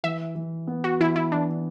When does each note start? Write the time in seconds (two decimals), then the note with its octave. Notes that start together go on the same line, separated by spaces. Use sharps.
0.04 E3 E5
0.35 E3
0.67 B3
0.84 F#4
1.00 E3 E4
1.16 E4
1.32 E3 D4